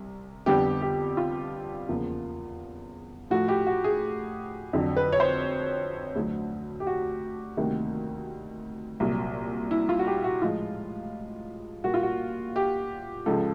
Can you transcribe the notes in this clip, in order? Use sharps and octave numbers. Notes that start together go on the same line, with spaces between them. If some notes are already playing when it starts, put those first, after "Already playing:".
Already playing: C2
F2 D3 G3 B3 G4
G4
F4
E2 C#3 F3 A#3
A2 F3 A3 F#4
G4
F#4
G#4
F2 D3 F#3
B4
C#5
C5
D2 D3 F#3
G4
F#4
D2 C3 D#3 G3 A#3
C2 A#2 F#3
E4
F4
F#4
G4
F#4
A2 F3 G#3 F4
A#2 G3 A#3 F#4
F4
F#4
G4
C#2 C#3 F3 A4